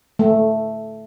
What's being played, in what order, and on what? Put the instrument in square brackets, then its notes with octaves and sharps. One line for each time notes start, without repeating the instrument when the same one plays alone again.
[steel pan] A3